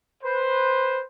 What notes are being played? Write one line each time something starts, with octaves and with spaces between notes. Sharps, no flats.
B4 C5